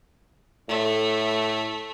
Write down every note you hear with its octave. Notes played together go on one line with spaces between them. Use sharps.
A2 A3